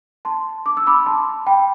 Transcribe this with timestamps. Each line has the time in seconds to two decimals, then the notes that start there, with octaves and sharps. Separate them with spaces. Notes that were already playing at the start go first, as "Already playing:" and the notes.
0.25 A5 C6
0.66 D6
0.77 E6
0.87 B5 D6
1.06 A5 C6
1.47 G5 B5